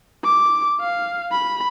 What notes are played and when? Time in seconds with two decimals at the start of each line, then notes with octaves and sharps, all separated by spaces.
0.24 D6
0.80 F5
1.32 B5